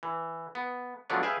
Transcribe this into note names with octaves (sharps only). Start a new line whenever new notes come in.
E3
B3
F3 F#3 G#3 A3 B3 D4
G#4 B4 E5 F5 G5 G#5